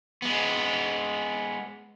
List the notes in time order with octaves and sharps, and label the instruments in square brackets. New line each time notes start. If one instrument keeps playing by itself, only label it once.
[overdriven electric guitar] G#3 B3